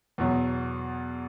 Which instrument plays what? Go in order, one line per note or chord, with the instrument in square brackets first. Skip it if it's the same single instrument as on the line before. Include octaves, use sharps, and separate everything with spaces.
[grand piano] E2 B2 F#3